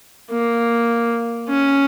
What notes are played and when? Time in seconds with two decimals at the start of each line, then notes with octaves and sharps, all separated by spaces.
0.31 A#3
1.49 C#4